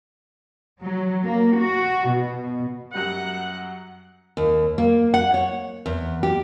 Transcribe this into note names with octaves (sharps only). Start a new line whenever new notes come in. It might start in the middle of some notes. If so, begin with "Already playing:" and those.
F#3
A#3
F#4
B2
F#2 F#3 G3 F#5
D#2
A#3
F#5
C#5
E2
G4